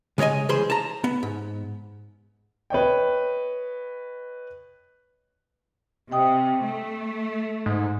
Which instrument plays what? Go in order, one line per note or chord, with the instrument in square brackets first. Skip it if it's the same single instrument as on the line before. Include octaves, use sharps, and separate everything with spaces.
[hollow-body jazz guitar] C#3 G#3 C#5 D#5 G#5
C2 E3 G#4 C5 C6
A5 A#5
B3
G#2
[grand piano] B4 C#5 D#5 G5
[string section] C3 [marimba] D#5 G5 D#6
[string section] A3
[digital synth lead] G#2